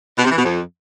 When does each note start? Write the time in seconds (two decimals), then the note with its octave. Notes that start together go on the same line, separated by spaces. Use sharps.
0.18 B2
0.25 C3
0.32 E3
0.38 B2
0.45 F2